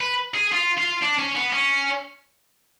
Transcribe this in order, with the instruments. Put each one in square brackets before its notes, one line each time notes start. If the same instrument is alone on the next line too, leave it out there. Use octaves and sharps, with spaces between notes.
[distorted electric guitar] B4
G#4
F4
F4
D4
C#4
B3
C#4